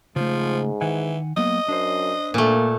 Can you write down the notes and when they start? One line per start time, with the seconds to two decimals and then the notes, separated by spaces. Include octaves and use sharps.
0.16 G#2 C#3 F3 A3
0.81 D#3 E3 F#5 G#5
1.37 F#3 A#3 B3 D#5
1.68 F#2 D4 C5
2.34 A#2 A3 A#3